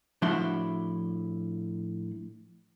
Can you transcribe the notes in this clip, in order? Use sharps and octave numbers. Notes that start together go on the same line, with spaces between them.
A2 F3 D4 E4 F#4 C6